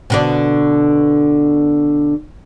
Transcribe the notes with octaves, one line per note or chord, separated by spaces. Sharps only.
B2 D3 D4